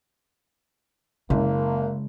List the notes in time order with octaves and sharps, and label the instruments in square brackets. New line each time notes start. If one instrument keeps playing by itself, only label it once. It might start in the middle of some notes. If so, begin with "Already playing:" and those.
[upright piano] F#1 [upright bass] C#3 G#3 [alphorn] A#3